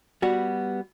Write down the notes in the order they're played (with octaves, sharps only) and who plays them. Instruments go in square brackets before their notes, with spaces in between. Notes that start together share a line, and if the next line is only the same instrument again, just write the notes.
[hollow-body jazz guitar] G3 B3 F#4